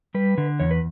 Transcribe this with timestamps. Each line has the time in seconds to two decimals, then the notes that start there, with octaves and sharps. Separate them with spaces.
0.14 G3 B4
0.38 D3
0.60 E2 C#5
0.71 B4